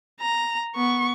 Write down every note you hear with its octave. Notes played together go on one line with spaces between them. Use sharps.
A#5
B3 C#6